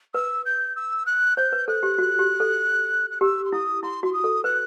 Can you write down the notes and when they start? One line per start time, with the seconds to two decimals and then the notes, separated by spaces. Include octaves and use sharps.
0.14 B4 E6
0.46 G6
0.76 E6
1.06 F#6
1.37 C5 G6
1.52 B4
1.68 A4 F#6
1.83 G4
1.98 F#4
2.19 G4
2.40 A4
3.11 F#6
3.21 G4 E6
3.45 C6
3.52 E4 D#6
3.83 E4 C6
4.03 F#4 C6
4.13 D#6
4.24 A4
4.44 B4 F#6